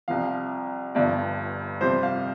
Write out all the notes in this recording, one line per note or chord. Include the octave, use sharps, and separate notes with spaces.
C2 C3 F3 F5
G1 G2 F3 D5
F2 C3 G3 C5
F5